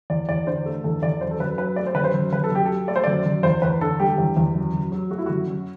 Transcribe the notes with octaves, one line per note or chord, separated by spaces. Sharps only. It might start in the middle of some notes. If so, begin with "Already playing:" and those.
E2 D5
E2 D5
D3 C5
A3
E2 A4
E2 D5
F#2 C5
A4
F#2 B4
F#3 B4
A3 D5
C5
F#2 B4
C5
F#2
F#2 B4
A4
F#2 G4
F#3 A4
A3 D5
C5
F#2 D5
F#2
E2 C5
E2 B4
D3 A4
G3 G4
E2
E2
F#2
F#2
F#3
A3 F#4
E4
F#2 F#4
F#2